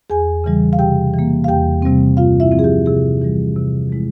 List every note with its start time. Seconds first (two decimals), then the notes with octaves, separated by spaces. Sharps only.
0.10 E2 G#4 G#5
0.44 C#3 E3 G3
0.73 F5
0.79 C3 G4 G5
1.14 E3
1.19 A#3
1.44 F5
1.48 E2 G4 G5
1.82 C3 G3 C4
2.17 G2 F4 F5
2.40 E4 E5
2.52 F3 C4
2.59 G#4
2.64 G4
2.86 C3 G#4
3.22 E3 G3
3.56 C3
3.90 F3 G#3 E4